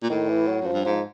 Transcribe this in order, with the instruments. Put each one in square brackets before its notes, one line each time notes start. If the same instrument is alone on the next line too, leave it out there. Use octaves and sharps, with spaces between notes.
[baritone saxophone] A#2
[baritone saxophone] A2 [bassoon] D#3
[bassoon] E3
F#3
[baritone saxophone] F#2 [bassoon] F3
[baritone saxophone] G2
[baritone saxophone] G#2 [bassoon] F3